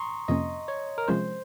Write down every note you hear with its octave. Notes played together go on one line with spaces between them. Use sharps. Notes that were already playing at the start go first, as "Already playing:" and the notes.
Already playing: A#5 C6 C#6 D#6
F2 C3 F3 A#3 C#4 D#5
C#5
A#4
C3 F3 G#3 C#4 C5